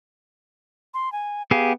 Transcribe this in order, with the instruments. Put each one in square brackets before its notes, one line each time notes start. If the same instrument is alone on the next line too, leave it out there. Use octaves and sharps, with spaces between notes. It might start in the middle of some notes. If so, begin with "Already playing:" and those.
[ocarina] C6
G#5
[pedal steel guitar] B3 G4 G#4 [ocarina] F5